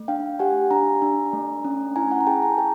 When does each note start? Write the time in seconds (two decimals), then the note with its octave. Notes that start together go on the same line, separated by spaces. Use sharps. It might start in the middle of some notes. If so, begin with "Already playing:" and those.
Already playing: A3
0.08 D4 F5 G5
0.39 G4 F#5 G#5
0.71 D4 G#5 A#5
1.02 D4
1.33 A3
1.65 C#4
1.96 E4 G#5 A#5
2.11 F#5 G#5
2.21 A#5
2.27 G#4 G5 A5
2.43 G#5 A#5
2.58 G#4 G5 A5